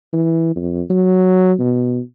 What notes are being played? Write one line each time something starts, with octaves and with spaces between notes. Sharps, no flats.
E3
F2
F#3
B2